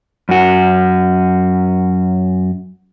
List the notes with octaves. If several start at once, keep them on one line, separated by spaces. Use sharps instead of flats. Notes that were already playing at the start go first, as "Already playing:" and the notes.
F#2 F#4